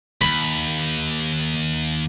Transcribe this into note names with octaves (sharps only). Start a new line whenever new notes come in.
D#2 B5